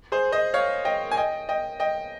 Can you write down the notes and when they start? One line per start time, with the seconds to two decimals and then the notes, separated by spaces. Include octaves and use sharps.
0.12 G#4 C5
0.32 C5 D#5
0.54 C#5 F5
0.85 D#5 G5
1.11 G#5
1.17 D#5 G5
1.49 D#5 G5
1.80 D#5 G5